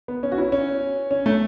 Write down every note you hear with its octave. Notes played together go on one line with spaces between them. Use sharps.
B3
C#4
F#4
E4
C#4
C#4
A3